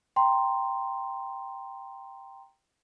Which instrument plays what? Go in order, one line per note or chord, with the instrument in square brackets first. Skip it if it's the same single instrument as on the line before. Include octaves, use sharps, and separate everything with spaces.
[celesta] G5 A#5 C6